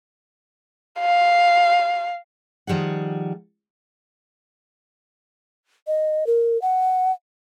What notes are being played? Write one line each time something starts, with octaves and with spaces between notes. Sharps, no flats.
F5
D#3 F3 G3 G#4 F#5
D#5
A#4
F#5